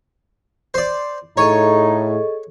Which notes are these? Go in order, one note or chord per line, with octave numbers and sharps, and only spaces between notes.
C5 D5
A2 D#4 G#4 A4 C#5 D#5